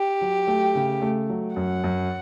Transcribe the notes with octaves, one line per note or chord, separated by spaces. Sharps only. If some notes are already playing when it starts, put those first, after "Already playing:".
Already playing: G4
F#3
A3
C#3
A3
F#3
F#2 F#5
F#2